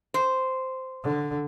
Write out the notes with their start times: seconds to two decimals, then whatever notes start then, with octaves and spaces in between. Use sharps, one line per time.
0.14 C5
1.04 D3